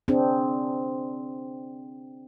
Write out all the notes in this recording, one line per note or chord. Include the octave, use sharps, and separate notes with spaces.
C4 D4 G#4